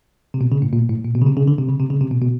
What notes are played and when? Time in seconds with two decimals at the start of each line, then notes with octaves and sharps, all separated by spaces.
0.34 C3
0.41 B2
0.52 C#3
0.62 A2
0.73 A#2
0.89 A2
1.05 A#2
1.15 B2
1.22 C#3
1.26 C3
1.37 C#3
1.48 D3
1.58 C3
1.69 C#3
1.80 C3
1.90 C#3
2.01 C3
2.11 B2
2.22 B2